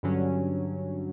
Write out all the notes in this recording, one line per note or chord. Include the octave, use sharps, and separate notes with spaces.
G2 D3 F#3 C#4